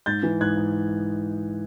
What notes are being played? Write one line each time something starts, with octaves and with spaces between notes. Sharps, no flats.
G#2 G6 A6
E3
G#2 F#6 G#6
G#2